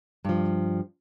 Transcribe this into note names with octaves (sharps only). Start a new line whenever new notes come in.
G2 F3